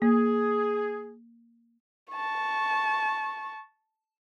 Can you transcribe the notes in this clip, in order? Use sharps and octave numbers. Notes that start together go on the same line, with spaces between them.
A#3 G#4
A5 C#6